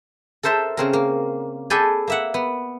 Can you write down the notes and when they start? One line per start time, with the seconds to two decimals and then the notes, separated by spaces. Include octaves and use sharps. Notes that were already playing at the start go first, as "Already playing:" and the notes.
0.43 A4 A#4 C5 E5 A5
0.77 C#3 C4 A#4
0.93 A#3
1.70 G#4 A4 B4 D5 G5 G#5
2.07 A#3 E5 F#5
2.34 B3